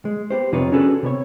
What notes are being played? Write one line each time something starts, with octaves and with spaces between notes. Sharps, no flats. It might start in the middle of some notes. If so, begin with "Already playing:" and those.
G#3
B3 G4 C5
F2 C3 D#4 F4 B4 C#5
C#4 D4 F#4 G#4 A4 B4
C3 B3 C#5